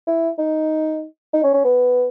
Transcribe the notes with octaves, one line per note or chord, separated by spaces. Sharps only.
E4
D#4
D#4
C#4
C#4
B3